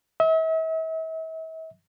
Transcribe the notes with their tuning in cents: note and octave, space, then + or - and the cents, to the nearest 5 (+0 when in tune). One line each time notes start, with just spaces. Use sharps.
E5 -40